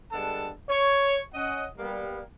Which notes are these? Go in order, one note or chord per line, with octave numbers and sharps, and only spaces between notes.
D3 G3 G#3 B3 A4 A5
C#5
C#4 D#5 F#5
G3 A#3 B3